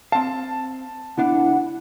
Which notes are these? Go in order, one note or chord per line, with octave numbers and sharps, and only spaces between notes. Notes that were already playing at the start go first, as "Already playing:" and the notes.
C4 F5 A5
C#2 B3 D4 E4 F#5